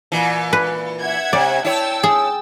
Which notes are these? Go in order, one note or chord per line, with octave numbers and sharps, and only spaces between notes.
A#2 E3
B4
E5 F#5 G#6
C3 D5
E4 C#5 G5 A5 E6
G#4